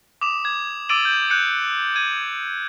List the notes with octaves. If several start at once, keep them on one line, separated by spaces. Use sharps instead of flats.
D6 D#6 E7
G#6
D6 E6 A6 D7 D#7 F#7
G6
F#6 G6 C#7
G#6 D#7